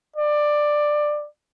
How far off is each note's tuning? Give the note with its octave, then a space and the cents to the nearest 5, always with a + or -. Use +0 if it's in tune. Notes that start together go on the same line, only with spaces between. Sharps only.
D5 +15